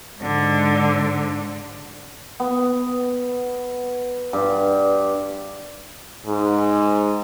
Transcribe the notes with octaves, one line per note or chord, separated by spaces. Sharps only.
G#2 D3
B3
G2
G#2